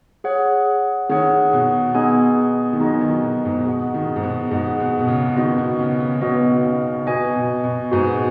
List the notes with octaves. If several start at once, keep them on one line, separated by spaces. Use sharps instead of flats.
G#4 C#5 F#5
D#3 G#4 C#5 F#5
B2
B3 D#4 G#4 D#5 G#5
D#3
F#3 B3 D#4 G#4 D#5 G#5
D#3
B2
G#2
B2 G#4 D#5 F#5
D#3
G#2
B2
G#2 G#4 D#5 F#5
B2
B2
C#3
D#3 B3 F#4 B4 D#5
B2
C#3
C#3
B2
C#3 B3 F#4 B4 D#5
C#3
B2 F#4 B4 D#5 G#5
B2
B2
G#2 F#4 B4 D#5 G#5
B2